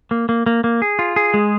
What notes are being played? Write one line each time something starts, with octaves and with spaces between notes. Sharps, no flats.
A#3
A#3
A#3
A#3
G#4
F4
G#4
G#3